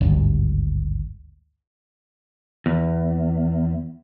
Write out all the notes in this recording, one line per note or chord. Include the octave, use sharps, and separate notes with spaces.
G#1 D2 G2
E2